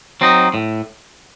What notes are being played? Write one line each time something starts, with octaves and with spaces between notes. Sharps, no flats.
F#3 C4 D#4
A2